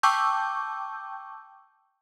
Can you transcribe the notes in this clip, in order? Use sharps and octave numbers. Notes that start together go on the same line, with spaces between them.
G5 A5 C#6 D6 E6 G6